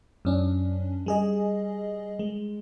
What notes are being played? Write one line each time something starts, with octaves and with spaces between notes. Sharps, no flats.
F#2 C#4 D4
G3 G#4 D#5
G#3